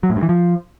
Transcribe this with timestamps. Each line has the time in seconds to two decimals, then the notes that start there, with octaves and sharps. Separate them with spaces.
0.03 F#3
0.10 A2
0.16 G2
0.23 E3
0.29 F3